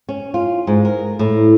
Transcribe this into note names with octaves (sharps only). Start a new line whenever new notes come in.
C#4
F4
G#2
A#4
A2